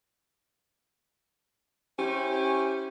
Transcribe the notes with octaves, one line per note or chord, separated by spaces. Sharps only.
C#4 E4 G4 C5